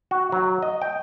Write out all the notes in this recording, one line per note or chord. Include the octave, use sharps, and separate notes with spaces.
F#4
F#3
D#5
G5